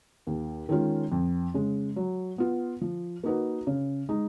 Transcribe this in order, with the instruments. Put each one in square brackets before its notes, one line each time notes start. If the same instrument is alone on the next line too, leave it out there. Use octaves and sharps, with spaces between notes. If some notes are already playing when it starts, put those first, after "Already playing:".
[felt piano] D#2
D#3 G#3 C#4 F4
F2
C#3 G#3
F#3
B3 F4
F3
A#3 D#4 F#4 B4
C#3
G#3 D#4